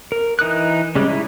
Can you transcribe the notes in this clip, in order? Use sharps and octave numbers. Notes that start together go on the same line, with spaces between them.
A#4
E3 D#4 D#6 F#6
C#3 G3 G#3
E4